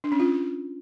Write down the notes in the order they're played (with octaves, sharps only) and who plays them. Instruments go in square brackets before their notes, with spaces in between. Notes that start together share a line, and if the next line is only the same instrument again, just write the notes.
[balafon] D4
C#4
F4